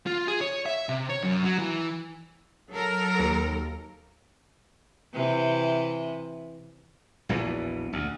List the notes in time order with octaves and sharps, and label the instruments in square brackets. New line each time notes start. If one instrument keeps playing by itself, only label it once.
[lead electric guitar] F4
G#4
C#5
E5
C3
C#5
F#2
F#3
E3
[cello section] F#3 A4 A#4
[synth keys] D#2
[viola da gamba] C3 E3
[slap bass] A#1 E2 B2 E3
D2